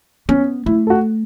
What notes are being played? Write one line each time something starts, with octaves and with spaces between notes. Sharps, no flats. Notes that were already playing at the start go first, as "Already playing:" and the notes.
B3 C#4
A3 E4
A4
F#4